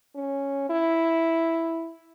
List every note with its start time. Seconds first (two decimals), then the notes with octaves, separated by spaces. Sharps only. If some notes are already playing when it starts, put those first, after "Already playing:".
0.15 C#4
0.70 E4